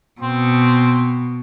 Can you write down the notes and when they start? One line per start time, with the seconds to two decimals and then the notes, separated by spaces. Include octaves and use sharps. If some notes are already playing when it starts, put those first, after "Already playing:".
0.22 B2 C4